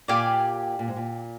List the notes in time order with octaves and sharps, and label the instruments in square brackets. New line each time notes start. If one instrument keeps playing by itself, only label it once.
[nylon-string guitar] A#2 [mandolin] G4 D5 F5 G#5
[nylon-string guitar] A#2
G#2
A#2